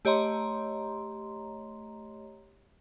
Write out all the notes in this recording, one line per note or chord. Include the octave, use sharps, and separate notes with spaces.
A3 G4 C#5 D#5 A#5 C6